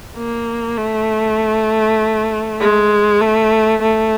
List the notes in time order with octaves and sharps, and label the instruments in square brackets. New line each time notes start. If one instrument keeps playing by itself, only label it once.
[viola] A#3
A3
G#3
A3
A3